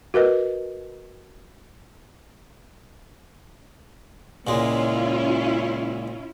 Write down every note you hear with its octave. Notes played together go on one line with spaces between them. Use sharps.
F#4 A#4 B4 D#5
C#2 A#2 G#3 C#4 E4 F4